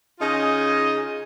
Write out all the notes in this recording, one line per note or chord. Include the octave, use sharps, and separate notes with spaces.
C#3 D#4 F4 D#5 G#5